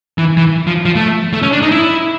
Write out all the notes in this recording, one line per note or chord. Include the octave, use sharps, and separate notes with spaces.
E3
E3
F3
F3
A3
A3
C#4
D4
D#4
E4